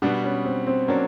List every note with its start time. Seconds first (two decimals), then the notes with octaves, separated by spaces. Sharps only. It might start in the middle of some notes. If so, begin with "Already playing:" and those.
0.02 B2 G3 B3 D4
0.24 C#4
0.45 C4
0.67 C4
0.88 F#3 A#3 C#4 D4